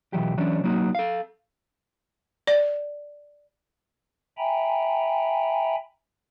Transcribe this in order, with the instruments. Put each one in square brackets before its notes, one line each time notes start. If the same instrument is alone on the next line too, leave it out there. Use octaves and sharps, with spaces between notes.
[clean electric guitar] B1 E3 F#3 G4
E3 F#3 C#4 D4
F#3 A#3 D#4 F#4
A4 F5
[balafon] D5
[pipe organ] E5 G5 G#5 A#5 B5